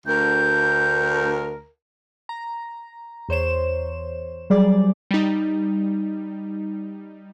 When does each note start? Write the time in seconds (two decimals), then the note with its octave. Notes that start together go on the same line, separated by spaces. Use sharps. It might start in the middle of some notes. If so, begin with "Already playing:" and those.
0.07 D2 A#4 G6
2.29 A#5
3.29 E2 C5 C#5 E7
4.50 F#3 G3 G#4 D5
5.11 G3 D#4